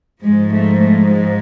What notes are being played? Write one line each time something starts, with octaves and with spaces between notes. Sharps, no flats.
G#2 F3 G#3
A3
A3
G#3